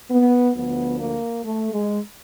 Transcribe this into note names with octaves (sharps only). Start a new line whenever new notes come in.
B3
D2 D3 F3 B3
A#3
A3
G#3